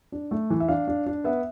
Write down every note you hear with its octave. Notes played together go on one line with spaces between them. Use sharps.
D4
A3
E3
E5
D4 F5
D4
D4
B3 E5